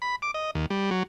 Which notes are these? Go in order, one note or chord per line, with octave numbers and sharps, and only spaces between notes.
B5
D6
D#5
D#2
G3
F#3